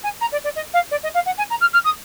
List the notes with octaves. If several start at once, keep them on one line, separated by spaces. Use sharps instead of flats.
G#5
A#5
D5
D5
D#5
F5
D5
D#5
F5
F#5
G#5
A#5
F6
F6
D#6